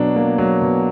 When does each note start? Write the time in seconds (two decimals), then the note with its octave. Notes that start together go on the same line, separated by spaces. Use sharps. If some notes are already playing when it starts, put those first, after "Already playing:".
Already playing: B2 F#3 D4
0.16 A#3
0.38 F#3
0.61 B2